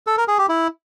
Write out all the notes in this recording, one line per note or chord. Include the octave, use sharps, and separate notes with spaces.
A4
A#4
G#4
G4
E4